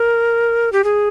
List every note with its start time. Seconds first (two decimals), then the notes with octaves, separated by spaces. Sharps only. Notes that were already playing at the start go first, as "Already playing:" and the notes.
Already playing: A#4
0.72 G4
0.84 G#4